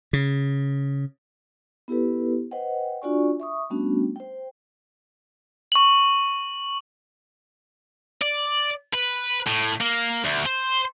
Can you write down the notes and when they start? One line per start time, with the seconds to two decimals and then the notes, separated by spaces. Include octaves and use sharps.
0.13 C#3
1.88 B3 E4 G4 A4 B4
2.51 B4 C5 D#5 F#5 G5
3.02 D4 F4 F#4 D5 G#5 C#6
3.40 E5 C#6 D#6
3.70 G3 A3 B3 C#4 D4 F#4
4.16 C5 G5
5.72 C#6 F#7
8.21 D5
8.93 B4
9.47 A2
9.81 A#3
10.25 D2
10.46 C5